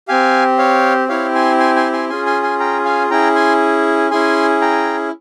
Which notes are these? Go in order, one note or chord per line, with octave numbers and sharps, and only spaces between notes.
C4 G4 F5 G#5
C#5 F5
C4 E4 G4 C#5 F5
G#5 C6
G#5 C6
G#5 C6
G#5 C6
C#4 F4 G#4 G#5 C6
G#5 C6
G#5 C6
G5 A#5
F5 G#5
C#4 E4 G#4 G5 A#5
G#5 C6
C#4 E4 G#4 G#5 C6
G5 A#5